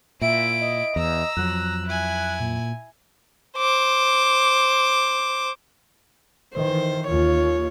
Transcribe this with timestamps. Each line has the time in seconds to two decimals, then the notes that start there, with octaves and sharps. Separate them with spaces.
0.21 A#2 E4 E5 D7
0.61 D#5
0.96 E2 A#5 E6
1.37 F2 F#3 F#6
1.87 E4 G#5
2.40 A#2
3.57 C5 D6
6.55 D#3 E3 C5
7.07 D#2 F4 C#5